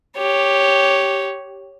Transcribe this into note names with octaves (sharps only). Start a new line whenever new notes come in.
G4 C#5